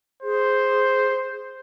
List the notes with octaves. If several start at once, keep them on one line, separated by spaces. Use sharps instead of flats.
G#4 C5